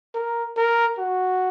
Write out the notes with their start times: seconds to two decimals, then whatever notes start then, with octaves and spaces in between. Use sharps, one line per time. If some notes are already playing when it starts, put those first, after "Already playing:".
0.15 A#4
0.57 A#4
0.99 F#4